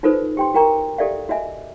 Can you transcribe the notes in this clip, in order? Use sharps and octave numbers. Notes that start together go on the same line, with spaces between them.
D#4 F4 A4 B4 C5
G4 G5 C6
F#4 A#4 G5 A#5 C#6
G4 A4 D5 E5 F5
F#4 D#5 E5 G#5